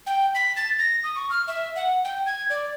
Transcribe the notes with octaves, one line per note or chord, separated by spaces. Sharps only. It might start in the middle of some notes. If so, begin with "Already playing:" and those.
G5
B6
A6
A#6
D#6
C#6
F6
E5
F#5
G5
G#6
D5